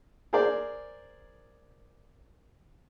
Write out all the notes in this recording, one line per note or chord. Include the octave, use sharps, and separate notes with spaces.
G#4 A#4 C5 D5